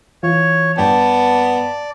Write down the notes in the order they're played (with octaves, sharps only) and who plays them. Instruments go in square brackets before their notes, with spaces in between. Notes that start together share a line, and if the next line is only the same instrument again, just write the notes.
[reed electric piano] E3 F4 [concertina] C#5
[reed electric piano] G2 G5 [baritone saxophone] B3 [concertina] D5 [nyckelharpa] A5